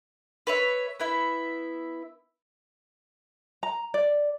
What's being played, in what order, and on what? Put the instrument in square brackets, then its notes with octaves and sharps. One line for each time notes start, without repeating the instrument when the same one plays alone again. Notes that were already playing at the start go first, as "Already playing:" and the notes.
[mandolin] B4 C#5 E5
B3 E4 E5
[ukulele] A#5
D5